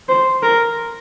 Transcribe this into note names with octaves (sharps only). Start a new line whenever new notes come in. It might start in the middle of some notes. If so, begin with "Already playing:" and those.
C5
A#4